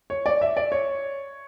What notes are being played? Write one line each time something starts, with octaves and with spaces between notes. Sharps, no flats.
C#5
D5
E5
D5
C#5